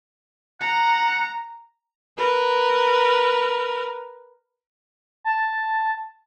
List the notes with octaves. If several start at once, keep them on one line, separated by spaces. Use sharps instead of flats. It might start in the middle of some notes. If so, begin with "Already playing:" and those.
F#5 A#5
A#4 B4
A5